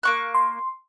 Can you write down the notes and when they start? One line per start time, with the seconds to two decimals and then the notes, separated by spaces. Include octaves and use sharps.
0.03 A#3 C#6 F#6
0.35 C6